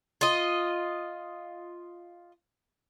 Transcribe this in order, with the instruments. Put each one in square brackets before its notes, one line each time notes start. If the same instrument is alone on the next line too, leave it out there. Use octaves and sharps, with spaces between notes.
[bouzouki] F4 D#5